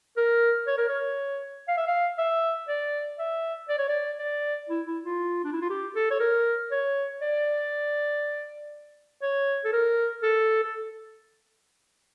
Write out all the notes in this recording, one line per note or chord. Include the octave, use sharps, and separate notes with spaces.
A#4
C#5
A#4
C#5
F5
E5
F5
E5
D5
E5
D5
C#5
D5
D5
E4
E4
F4
D4
E4
F4
G4
A4
C#5
A#4
C#5
D5
C#5
A4
A#4
A4
A4